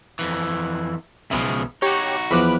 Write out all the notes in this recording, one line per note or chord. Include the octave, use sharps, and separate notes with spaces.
F2 E3
B1 C#3 F3 G#3 B3 E5
D#4 F#4 G4 C#5
E2 F3 B5 D6 F#6